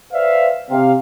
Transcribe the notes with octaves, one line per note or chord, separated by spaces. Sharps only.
B4 C5 D5 E5 F5
C3 F5